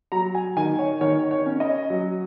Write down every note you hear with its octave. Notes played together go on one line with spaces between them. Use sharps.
F#3 A#5
G#5
D#3 G#5
C#5
D#3 C#5
C#5
C#4
D#5
F#3